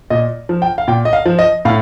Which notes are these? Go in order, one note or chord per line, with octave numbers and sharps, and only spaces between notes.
A#2 D#5
F3
G5
F5
A#2 G5
D#5
F5
F3
D#5
A2 F5